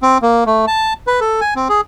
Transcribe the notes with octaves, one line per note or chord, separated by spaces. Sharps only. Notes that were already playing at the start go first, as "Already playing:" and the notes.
C4
A#3
A3
A5
B4
A4
G#5
C4
G#4